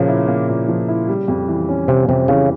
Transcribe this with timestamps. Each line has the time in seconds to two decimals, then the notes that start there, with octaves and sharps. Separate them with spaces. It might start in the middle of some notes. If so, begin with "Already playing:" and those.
Already playing: A#2 C#3 F3 A#3
0.08 E4
0.28 A#3
0.48 A#2
0.68 F3
0.88 E4
1.08 G3
1.28 F2
1.48 E3
1.69 C#4
1.88 C3 G3
2.08 F2 C3
2.28 C#3 E3